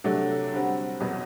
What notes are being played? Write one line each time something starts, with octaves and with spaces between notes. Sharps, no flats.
C3 F#3 A3 D4
D3 G3 C4 F#4
E2 B2 F#3 B3